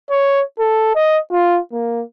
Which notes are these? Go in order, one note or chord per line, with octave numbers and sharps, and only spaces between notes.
C#5
A4
D#5
F4
A#3